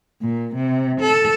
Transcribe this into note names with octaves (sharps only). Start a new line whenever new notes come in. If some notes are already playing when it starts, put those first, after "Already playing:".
A#2
C3
A4